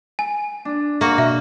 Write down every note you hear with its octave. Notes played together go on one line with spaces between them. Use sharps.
G#5
D4
A#3 F#4
B2 E5